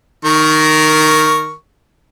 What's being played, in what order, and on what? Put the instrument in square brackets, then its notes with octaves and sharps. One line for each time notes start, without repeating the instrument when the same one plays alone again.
[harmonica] D#3 A#4 C#6